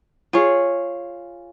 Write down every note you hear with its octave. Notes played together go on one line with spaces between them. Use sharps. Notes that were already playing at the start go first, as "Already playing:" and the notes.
F4 G#4 C#5